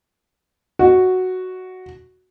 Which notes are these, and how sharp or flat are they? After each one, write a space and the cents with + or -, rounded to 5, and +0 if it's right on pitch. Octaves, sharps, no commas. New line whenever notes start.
F#4 +0 D#5 +0